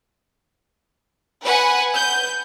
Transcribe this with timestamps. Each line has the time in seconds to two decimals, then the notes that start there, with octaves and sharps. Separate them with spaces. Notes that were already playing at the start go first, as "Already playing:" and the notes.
1.43 B4 F#5 G#5 B5
1.95 G6